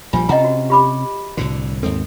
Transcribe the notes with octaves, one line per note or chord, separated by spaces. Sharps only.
A#1 F3 G3 F4 G#5
C3 C#4 D#5 F#5 A#5
F#4
G4 B5 D6
C2 A2 D3 F#4
D#2 G#2 C4 A4